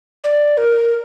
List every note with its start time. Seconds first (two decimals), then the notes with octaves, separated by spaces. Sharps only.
0.24 D5
0.57 A#4